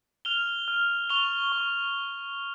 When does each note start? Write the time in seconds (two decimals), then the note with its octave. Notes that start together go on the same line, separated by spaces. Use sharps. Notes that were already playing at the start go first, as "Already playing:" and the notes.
0.25 F6 F7 G7
0.68 F6
1.10 C#6 F7 G7
1.52 C#6